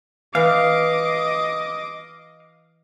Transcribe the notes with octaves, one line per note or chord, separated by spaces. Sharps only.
E3 D#5 F5 D6